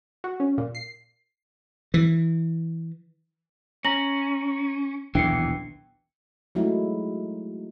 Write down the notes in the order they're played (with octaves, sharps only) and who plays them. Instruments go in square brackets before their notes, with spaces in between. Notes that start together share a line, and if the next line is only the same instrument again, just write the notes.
[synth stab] F#4
C#4
A#2
C7
[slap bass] E3
[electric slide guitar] C#4 [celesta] A#5 A#6 F#7
[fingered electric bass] D#1 B1 D4 [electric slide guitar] E2 E3 [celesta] G5 C7 C#7
[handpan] F#3 G#3 A3 D#4 E4 F#4